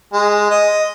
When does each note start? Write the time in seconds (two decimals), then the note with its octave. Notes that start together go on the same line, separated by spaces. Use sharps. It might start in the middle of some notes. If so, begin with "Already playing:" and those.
0.13 G#3
0.51 D#5